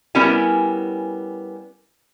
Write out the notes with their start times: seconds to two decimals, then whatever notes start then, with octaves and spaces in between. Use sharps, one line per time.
0.15 G3 B3 C#4 E4 A#4 G#5